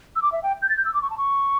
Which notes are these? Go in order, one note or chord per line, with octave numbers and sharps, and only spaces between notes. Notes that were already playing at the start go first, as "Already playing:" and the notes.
E6
D6
E5
G5
G6
A6
G6
E6
D6
C#6
A5
C#6